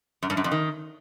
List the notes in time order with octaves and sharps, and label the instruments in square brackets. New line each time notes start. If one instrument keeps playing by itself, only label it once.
[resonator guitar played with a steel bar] F#2
G2
F#2
F2
D#3